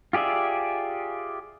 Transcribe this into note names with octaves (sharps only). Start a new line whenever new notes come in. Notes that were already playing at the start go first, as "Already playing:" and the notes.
F4 G4 G#4 D5 E5